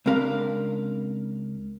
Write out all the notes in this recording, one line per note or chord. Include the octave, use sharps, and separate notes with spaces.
C#2 C4 D4 A#4 F5 B5